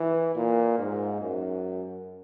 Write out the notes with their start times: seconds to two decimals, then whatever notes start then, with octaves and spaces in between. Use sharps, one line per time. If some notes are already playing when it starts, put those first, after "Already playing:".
Already playing: E3
0.36 A#2
0.79 G#2
1.21 F#2